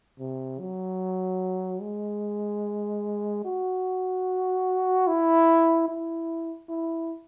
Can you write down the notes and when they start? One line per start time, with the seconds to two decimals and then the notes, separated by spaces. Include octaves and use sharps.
0.19 C3
0.60 F#3
1.82 G#3
3.45 F#4
5.07 E4
5.88 E4
6.69 E4